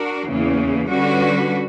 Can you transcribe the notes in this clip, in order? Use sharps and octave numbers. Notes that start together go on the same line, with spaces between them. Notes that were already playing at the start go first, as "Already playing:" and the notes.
Already playing: D4 F#4 A#4
E2 C#3 E3 A#3
D3 G3 C#4 F#4 B4